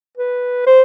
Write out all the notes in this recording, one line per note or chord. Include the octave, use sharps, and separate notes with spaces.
B4
C5